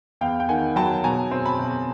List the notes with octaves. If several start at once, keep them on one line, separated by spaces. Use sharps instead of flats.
E2 F5 G5
G5
D#3 F#5 G#5
F#3 G5 A5
B2 G#5 A#5
C4
A5 B5
B2